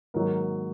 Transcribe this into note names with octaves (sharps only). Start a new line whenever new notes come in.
G#2 D#3 F#3 A#3 A#4